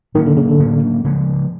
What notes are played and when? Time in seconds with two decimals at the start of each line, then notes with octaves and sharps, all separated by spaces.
0.15 A2 D#3 F#3 A#3 C#4
0.26 D3
0.37 C#3
0.48 D3
0.59 A2 F#3 A#3 C#4
1.04 C#3 F3 G#3 B3